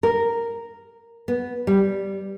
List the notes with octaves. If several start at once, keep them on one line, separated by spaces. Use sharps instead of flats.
A#4
B3
G3